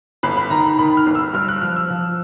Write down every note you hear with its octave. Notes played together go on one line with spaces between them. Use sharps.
G1 B5
B5
D#3 A#5
B5
D#3 B5
F6
G1
E6
G2 F6
F#6
F3 F6
E6
F3